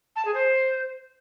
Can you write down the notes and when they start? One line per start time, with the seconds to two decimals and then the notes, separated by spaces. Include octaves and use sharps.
0.16 A5
0.25 G#4
0.34 C5